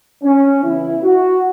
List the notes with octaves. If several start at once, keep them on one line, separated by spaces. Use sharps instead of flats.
C#4
C#3 E3 B3 E4
F#4